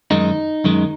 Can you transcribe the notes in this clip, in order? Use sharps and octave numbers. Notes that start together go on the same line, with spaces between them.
F#2 D#3 G#3 D#4
F#2 D#3 G#3